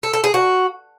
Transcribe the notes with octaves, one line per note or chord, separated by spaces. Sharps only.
A4
A4
G#4
F#4